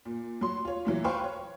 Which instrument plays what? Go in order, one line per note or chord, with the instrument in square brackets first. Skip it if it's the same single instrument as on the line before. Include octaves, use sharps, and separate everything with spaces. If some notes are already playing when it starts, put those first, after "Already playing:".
[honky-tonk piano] A#2
F#3 C6
F4 C#5
A#2 E3 F#3
B4 C5 F5 G5 C6 C#6
C#5